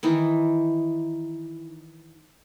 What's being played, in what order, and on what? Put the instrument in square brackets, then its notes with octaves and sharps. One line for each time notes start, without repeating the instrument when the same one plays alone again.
[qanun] D#3 E3 D#4 E4